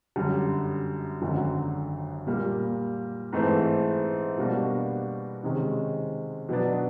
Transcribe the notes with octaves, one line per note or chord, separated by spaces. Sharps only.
F#2 D3 G3
G#1 F#2 D3 F#3
A#2 G3 A#3
G#2 E3 A3 C4
B2 G3 A#3 D4 F#4
C3 D#3 G#3 C#4
B2 F#3 B3 D4